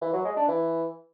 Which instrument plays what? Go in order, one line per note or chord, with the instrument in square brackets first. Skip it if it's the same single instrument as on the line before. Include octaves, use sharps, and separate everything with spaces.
[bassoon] E3
F#3
G#3
D4
E3